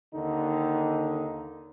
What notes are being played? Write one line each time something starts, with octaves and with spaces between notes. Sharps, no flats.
D#2 D3 D#3 D#4